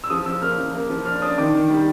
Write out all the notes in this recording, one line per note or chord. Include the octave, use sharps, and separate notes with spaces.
E6
F3 D#6
F3 E6
A#3 F6
F3
A#3
F3
D4 F6
D4 D#6
D#3 D6
D#3
G3